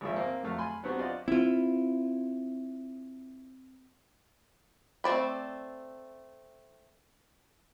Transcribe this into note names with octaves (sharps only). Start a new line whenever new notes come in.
G#1 G#2 F3 A#3 E5
A#3 C4
F2 F#3 A3 F5
G#5 B5 C6
F#3 B3 C4 D4 F#4 G4
F4 C5 D5 D#5 F5 F#5
C4 E4 F4
A3 C4 D5 B5